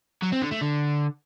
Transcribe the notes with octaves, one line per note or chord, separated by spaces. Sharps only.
F#3
C4
D3
A3
D3